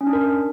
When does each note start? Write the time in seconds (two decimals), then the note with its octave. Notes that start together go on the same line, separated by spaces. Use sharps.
0.01 C#4
0.07 D4
0.13 A#4